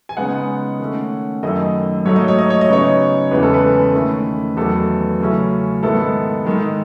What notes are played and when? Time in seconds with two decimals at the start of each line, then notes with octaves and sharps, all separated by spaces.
0.09 G#5
0.17 C#3 G#3 B3 D#4 F#5
0.79 D#3 A3 C#4
1.43 F#2 D#3 A3 E4 D#5
2.05 G#2 F#3 A3 D#4 C#5
2.16 D#5
2.28 C#5
2.39 D#5
2.50 C#5
2.61 D#5
2.69 C#3 F#3 B3 D#4 C#5
3.31 E2 C#3 E3 G#3 B4
3.42 A4
3.54 B4
3.94 D#3 A3 C#4 E4
4.57 E2 D#3 F#3 A3 A4
5.20 C#3 F#3 A3 C#4 E4
5.83 G#2 D#3 G#3 B3 E4 A4
6.45 G#2 D#3 G#3